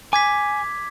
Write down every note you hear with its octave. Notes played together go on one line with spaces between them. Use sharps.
G#5 D6 G#6 B6